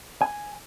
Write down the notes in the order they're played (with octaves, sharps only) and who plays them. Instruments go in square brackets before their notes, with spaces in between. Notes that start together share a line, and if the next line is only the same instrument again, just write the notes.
[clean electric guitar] G#5